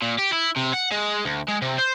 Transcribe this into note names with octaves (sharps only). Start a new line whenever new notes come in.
A#2
G4
E4
C3
F#5
G#3
D2
G#3
C3
C5